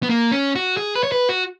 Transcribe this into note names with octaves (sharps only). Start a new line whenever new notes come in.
B3
A#3
C#4
F#4
G#4
B4
C#5
B4
F#4